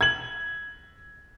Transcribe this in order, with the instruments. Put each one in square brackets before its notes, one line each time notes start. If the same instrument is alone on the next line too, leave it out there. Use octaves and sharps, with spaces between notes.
[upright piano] G#6 F#7